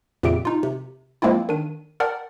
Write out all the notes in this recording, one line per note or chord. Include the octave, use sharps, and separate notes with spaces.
F2 A#2 C#3 G4 E5 D7
D#4 F4
C3
F3 G#3 A#3 C4 E4 F4
D#3 D4 D#7
A#4 D5 F#5 G5 A5